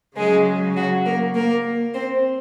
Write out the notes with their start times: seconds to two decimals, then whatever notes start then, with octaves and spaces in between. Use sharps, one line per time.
0.16 C#3 F#3 G#3 G#4
0.76 F#3 F#4
1.05 A#3 A#4
1.34 A#3 A#4
1.94 C4 C5